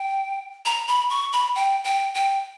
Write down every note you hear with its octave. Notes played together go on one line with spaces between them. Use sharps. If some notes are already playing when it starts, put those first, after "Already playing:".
Already playing: G5
A#5
B5
C#6
B5
G5
G5
G5